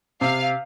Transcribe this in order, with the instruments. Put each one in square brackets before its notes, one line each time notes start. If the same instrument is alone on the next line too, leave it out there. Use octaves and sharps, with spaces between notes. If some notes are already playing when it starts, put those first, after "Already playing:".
[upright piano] C3 [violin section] F5